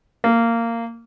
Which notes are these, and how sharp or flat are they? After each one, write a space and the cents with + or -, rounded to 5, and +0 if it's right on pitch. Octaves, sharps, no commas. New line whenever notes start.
A#3 -15